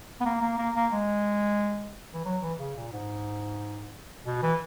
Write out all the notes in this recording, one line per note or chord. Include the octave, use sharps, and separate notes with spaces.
B3
A#3
A#3
A#3
A#3
G#3
E3
F#3
E3
C#3
A#2
G#2
B2
E3